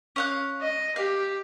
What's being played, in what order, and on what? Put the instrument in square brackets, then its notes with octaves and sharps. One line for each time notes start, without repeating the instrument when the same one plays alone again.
[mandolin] C#4 F5 F#6
[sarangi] D#5
[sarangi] G4 [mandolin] F5